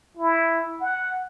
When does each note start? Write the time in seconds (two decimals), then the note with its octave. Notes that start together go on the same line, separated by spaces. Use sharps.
0.17 E4
0.81 F#5